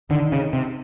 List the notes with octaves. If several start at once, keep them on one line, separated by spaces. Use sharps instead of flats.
D3 D#3
C#3
C3